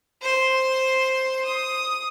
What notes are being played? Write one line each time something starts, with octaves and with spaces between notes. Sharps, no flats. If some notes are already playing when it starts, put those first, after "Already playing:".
C5 C6
D#6